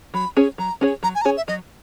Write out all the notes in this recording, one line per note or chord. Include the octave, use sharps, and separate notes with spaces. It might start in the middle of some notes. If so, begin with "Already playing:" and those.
F#3 B5
C#4 G#4 C#5
F#3 A#5
C#4 G#4 C#5
F#3 A#5
G#5
A#5
C#4 G#4 C#5 G#5
E5
F#3 D#5